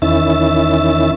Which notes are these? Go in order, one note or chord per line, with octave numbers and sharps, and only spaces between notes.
E2 D#3 C#4 E4 E5 A6